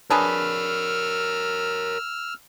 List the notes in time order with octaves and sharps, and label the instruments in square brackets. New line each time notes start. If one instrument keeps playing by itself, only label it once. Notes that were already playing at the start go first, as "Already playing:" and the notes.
[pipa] D4 G#4 B4 [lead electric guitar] A#4 C#5 [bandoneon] E6 F6